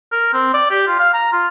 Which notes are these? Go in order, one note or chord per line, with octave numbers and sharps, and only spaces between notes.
A#4
C4
D5
G4
F4
F5
A#5
F4